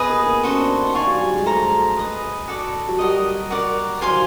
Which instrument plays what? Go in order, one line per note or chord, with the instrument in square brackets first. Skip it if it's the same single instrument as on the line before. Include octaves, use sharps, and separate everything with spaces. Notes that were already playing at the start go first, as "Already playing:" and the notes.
Already playing: [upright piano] B3 [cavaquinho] G#4 B4 D#5
[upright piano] A#3
B3
[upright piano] C#4 [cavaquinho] F#4 A4 C5
[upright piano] D4
D#4
[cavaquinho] D5 F5 G#5 C#6
[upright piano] F#3
G3
G#3
[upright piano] A3 [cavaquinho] A4 C5 F5 A#5
[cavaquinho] G#4 B4 D#5
F#4 A4 D5
[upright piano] F#3
[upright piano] G3 [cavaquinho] F#4 A#4 D#5
[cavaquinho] F#4 A#4 D5
[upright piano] F#3 [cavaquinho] C5 F5 G#5 C6
[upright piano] D#3